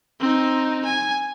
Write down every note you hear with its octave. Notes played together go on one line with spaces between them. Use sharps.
C4 D#4
G#5